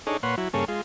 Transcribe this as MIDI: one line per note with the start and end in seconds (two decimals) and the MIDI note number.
0.07 0.17 62
0.07 0.17 63
0.07 0.17 68
0.07 0.17 69
0.07 0.17 73
0.23 0.35 46
0.23 0.35 71
0.23 0.35 73
0.23 0.35 78
0.23 0.35 84
0.38 0.48 54
0.38 0.48 64
0.54 0.65 43
0.54 0.65 49
0.54 0.65 58
0.54 0.65 68
0.54 0.65 69
0.54 0.65 73
0.68 0.81 56
0.68 0.81 65